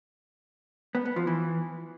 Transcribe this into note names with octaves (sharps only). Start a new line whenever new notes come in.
B3
B3
F3
E3